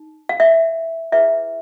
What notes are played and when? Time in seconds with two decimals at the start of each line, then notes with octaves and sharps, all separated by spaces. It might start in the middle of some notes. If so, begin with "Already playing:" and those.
Already playing: D#4
0.29 F5
0.40 E5
1.12 E4 G#4 B4 E5